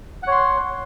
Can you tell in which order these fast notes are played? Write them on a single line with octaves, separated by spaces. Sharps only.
F#5 C#5 C6